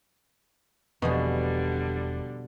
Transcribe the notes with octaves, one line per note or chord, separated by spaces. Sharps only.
E1 E2 B2 D3 F3 G3 C4 G#4